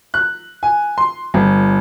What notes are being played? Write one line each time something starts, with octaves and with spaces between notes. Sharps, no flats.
F#6
G#5
C6
G1